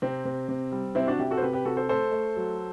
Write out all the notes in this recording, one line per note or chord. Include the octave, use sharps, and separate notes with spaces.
C3 C4
C3
C3
G3
C3 C4 E4
D4 F#4
C3 E4 G4
F#4 A4
C5
C3 G4 B4
G4 B4
C3 F#4 A4
A4 C5
A3 A4 C5
A3
F#3